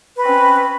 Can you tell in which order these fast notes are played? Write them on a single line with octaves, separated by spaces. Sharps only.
B4 F#4 C4 C#4